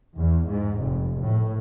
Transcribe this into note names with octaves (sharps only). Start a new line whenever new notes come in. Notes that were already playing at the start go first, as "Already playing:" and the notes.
E2
G#2
F1
A2